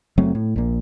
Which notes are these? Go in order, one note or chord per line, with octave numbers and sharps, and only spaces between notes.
F#1 F#3 A3 C4
A2
A#1 A#2